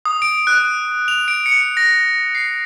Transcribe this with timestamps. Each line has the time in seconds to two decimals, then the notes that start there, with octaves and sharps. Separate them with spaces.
0.05 D#6
0.22 D7
0.47 F#6
1.08 F7
1.28 D7
1.46 C#7
1.77 A#6
2.35 C7